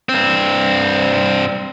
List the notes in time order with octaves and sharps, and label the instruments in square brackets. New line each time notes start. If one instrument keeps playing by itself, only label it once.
[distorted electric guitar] G2 C4